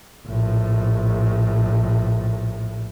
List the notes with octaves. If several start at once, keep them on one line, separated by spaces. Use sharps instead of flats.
A#1 A2